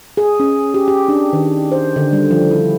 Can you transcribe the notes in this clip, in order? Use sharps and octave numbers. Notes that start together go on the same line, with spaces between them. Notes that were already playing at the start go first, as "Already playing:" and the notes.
G#4
C#4
G4
G4
D4
D#3
C5
D3
G3
F3
E4